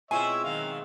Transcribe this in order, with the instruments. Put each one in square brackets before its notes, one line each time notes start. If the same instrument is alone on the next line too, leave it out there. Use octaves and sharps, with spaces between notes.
[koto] B2 G#3 C4 [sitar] E4 F4 [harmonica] C#5 E5 [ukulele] G#5
[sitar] D#3 F#3 [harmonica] F5